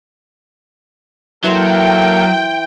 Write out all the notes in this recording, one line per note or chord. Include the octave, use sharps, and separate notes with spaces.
E3 F#3 A#3 A4 A#4 G5 C6